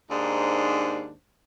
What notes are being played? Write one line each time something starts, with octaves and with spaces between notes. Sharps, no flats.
D#2 G#2 D4 C5